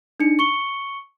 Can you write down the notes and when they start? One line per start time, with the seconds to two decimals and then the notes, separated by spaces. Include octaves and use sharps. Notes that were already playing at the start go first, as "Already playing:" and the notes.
0.20 D4 D#4 C#7
0.39 C#6 C#7 G7